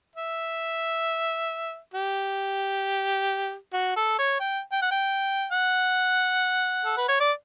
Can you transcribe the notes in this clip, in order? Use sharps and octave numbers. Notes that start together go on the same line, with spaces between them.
E5
G4
F#4
A4
C#5
G5
G5
F#5
G5
F#5
A4
B4
C#5
D5